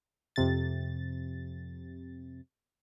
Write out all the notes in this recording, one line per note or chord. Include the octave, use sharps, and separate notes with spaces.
F2 C3 A6